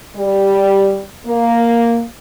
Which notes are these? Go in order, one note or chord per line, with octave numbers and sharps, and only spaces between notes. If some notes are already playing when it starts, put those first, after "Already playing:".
G3
A#3